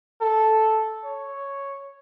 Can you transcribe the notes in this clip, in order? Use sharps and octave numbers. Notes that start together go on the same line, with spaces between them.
A4
C#5